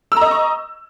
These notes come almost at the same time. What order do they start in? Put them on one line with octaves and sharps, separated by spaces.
E6 A#5 D#5 D#6 C#6